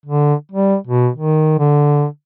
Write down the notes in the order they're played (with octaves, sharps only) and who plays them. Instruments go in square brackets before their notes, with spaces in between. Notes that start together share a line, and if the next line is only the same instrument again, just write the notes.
[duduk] D3
G3
B2
D#3
D3